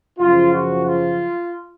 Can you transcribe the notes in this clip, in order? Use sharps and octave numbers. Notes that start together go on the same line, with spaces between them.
F#2 C#3 F3 F4
F#4
F4